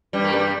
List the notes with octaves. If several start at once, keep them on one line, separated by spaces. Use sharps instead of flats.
G2 G3
A#3
G2 G3